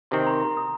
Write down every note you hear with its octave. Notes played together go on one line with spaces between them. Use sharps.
C3 D#3 C4 C6
A#5
A#5
D#6